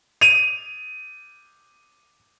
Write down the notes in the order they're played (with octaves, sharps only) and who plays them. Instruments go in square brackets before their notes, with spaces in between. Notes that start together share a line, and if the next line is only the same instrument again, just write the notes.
[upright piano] D#7 F7